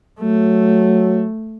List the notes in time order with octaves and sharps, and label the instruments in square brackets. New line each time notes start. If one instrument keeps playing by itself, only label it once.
[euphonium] F#3 [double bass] A3